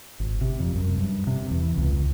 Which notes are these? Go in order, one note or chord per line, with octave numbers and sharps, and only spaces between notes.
G#1
C3
F2
F#2
G2
C3
E2
C#2